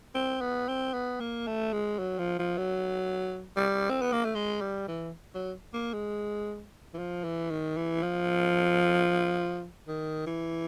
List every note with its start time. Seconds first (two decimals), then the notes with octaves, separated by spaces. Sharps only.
0.15 C4
0.41 B3
0.68 C4
0.94 B3
1.20 A#3
1.47 A3
1.73 G#3
1.99 F#3
2.19 F3
2.39 F3
2.58 F#3
3.57 G3
3.90 C4
4.01 B3
4.13 A#3
4.25 A3
4.35 G#3
4.61 G3
4.88 E3
5.35 F#3
5.74 A#3
5.93 G#3
6.94 E3
6.99 F3
7.24 E3
7.50 D#3
7.77 E3
8.03 F3
9.87 D#3
10.27 E3